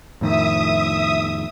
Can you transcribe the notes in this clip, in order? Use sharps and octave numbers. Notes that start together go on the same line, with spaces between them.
F2 A2 D#3 E5 D#6